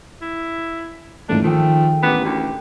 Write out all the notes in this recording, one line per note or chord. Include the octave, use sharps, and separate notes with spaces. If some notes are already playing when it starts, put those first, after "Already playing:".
E4
D#1 G#2 E3 A3 D4
D#3 F3 A3 G#4 A4 G5
A1 A#3 B3 D4 G4
D2